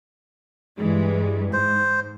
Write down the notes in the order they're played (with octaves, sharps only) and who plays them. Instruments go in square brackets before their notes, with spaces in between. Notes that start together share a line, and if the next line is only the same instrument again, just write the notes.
[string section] G2 E3 G#3
[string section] G#2 [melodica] C5